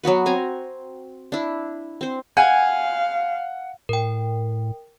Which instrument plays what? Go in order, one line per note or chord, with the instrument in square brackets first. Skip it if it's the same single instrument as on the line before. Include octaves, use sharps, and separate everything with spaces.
[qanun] F#3 B3 F#4 B4
C4 G#5 A#5
D4 E4
C4 C5
[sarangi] F5 [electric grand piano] F#5 [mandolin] G#5
[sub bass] A2 [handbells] A#4 G5